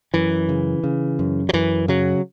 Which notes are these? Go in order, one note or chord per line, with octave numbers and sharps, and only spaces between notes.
F#2 E3
C#3
C#3
F#2
F#3
F#2 E3
C#3 F#3